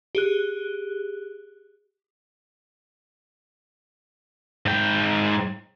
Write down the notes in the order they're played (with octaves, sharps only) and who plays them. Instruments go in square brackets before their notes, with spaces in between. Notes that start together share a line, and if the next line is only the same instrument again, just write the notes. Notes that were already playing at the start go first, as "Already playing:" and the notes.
[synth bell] G4 G#4 F#6
[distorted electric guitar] G#2 G5